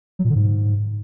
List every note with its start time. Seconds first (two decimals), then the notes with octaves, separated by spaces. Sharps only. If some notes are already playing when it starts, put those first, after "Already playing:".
0.19 F#3
0.25 A#2
0.30 D3
0.35 G#2